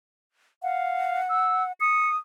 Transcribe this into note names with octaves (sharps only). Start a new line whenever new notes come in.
F5 F#5
E6
D#6 C#7